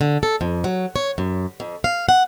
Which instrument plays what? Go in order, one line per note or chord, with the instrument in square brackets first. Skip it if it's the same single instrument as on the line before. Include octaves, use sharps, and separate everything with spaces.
[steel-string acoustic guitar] D3
A4
F2
F#3
C#5
F#2
F2
F5
F#5